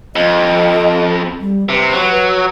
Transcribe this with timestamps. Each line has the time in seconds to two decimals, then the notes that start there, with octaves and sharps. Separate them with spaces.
0.16 F2 D#5
1.41 G3
1.70 C3 B4
1.93 F#3